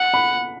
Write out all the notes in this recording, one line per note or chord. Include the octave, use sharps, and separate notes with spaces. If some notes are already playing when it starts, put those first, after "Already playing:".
Already playing: F#5
B5